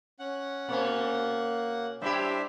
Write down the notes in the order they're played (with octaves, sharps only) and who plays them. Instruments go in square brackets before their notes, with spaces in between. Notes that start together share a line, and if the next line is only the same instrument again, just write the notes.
[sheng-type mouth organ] C#4 F#5
[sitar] B2 C#4 [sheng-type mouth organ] A#3 F#5
[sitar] G3 E4 G4 [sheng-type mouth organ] D4 C5 E5